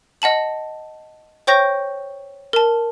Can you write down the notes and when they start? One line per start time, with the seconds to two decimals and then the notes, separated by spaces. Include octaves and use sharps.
0.22 D#5 F#5 A5 F#7
1.47 C5 C#5 G5 C#6 G6 A#6
2.53 A#4 A5